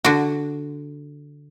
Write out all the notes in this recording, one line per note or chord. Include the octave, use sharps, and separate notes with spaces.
D3 F#4